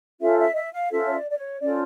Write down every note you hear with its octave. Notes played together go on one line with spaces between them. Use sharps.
C#4 F4 A4 C5 E5
E5
D#5
E5
F5
C#4 F4 A4 C5 E5
C#5
D5
D5
C#5
C#4 F4 A4 C5 D5